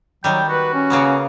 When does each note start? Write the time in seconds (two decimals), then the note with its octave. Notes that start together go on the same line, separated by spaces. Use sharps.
0.24 D#3 F#3 G3 G5
0.49 F#4 B4
0.74 C#4
0.90 C#3 A#3 B3